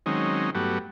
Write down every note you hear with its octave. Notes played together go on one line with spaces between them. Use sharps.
D#3 F#3 G#3 C4 C#4 D#4
G2 F#3 A3 B3 F#4 G4